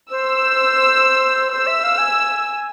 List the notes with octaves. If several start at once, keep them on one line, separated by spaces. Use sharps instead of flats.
C5 E6
C5 E6
E5
F5
G#5